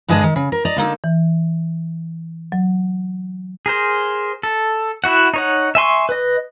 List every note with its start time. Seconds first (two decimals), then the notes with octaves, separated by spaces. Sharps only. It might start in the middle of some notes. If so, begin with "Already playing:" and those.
0.08 G2 D3 G#3 G#4 D#5 A5
0.23 D#3
0.36 C#3
0.52 A#4
0.65 D5 D#5 A#5
0.76 D3 A#3 D#4 A4
1.04 E3
2.52 F#3
3.66 G#4 A#4 C5
4.43 A4
5.04 E4 F#4 F#5
5.34 D#4 C#5 F#5
5.75 E5 G#5 C6 C#6
6.09 B4 D#5